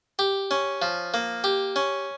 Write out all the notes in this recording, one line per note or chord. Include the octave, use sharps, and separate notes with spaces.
G4
C#4
F3
A#3
G4
C#4